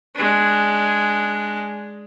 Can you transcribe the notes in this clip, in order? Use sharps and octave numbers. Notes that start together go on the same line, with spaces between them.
G#3 D4